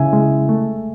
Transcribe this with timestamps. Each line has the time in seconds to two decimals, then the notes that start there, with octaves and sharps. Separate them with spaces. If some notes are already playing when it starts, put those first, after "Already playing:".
Already playing: C#3 E4 E5 G#5
0.13 G#3
0.49 A3